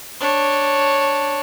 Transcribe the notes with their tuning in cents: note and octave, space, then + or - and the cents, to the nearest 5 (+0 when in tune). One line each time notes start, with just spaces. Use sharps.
D4 +0 C#5 -5